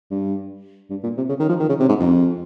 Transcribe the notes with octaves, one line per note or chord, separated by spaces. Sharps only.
G2
G2
A#2
C3
C#3
D#3
F3
D#3
C#3
C3
G#2
F2